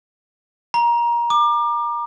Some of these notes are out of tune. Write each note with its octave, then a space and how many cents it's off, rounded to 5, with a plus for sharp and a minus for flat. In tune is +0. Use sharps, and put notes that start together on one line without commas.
A#5 +25
D6 +30